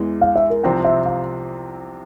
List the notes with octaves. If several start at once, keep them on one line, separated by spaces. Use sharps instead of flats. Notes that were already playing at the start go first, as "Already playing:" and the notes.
Already playing: E2 E3 G#3
F5
E5
A#4
C2 C3 F3 C4 G5
E5
F5